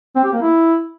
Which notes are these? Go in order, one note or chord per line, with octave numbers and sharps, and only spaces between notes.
C4
G4
A#3
E4